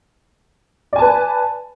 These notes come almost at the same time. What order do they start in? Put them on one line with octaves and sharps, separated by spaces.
D5 G#5 A5 B4